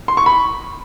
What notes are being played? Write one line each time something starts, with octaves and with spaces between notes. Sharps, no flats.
C6
C#6
B5